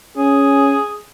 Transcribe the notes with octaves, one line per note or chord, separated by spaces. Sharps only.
C#4 G#4